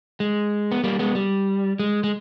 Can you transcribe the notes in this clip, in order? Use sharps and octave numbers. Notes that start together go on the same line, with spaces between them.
G#3
B3
G3 A#3
G#3 B3
G3
G#3
G#3